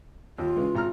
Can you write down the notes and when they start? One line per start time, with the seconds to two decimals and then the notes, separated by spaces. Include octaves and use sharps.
0.38 D#2 F4
0.56 C#3 E3 G#3
0.75 G#1 A#5 F6